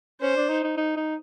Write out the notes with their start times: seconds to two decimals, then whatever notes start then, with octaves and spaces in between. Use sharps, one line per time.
0.22 C#4 C5
0.36 D4
0.49 D#4
0.64 D#4
0.77 D#4
0.96 D#4